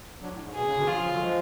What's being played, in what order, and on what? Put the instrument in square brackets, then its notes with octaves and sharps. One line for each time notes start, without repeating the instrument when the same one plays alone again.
[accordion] D3 F#3
A2
G#2
[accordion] B2 [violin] G#4
[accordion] C#3
B2 D3
[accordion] C#3 F3 [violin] F4
[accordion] C#3 F3
D3 F#3
F3 G#3